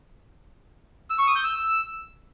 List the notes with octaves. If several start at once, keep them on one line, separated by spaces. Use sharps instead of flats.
E6
C#6
D#6
G6
E6